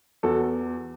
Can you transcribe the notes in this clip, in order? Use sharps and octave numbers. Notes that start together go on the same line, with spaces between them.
E2 F#4 A4